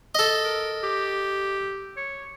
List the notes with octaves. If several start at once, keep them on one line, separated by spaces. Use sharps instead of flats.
A4 D#5
A#4
G4
C#5